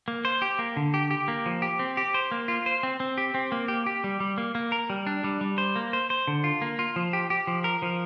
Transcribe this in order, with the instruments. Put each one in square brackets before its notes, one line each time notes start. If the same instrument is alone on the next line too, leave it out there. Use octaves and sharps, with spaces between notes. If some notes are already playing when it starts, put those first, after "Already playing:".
[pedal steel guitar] A#3
C5
G4
A#3
D3
G4
G4
A#3
F3
G4
C4
G4
C5
A#3
F4
C5
C4
C4
G4
C4
A#3
G4
G4
G3
G3
A#3
A#3
A#4
G3
D4
G3
G3
C5
A#3
C5
C5
D3
F4
A#3
F4
F3
G4
G4
F3
A#4
F3